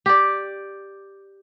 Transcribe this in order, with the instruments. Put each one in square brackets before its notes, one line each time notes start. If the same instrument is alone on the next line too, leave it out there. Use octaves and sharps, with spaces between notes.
[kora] G4 D5